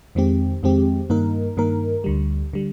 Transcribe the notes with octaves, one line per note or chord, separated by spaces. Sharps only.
F2 D#3 G#3 C4 G4
F2 D#3 G#3 C4 G4
G2 D#3 A#3 D#4 A#4
G2 D#3 A#3 D#4 A#4
D2 D3 G3
D3 G3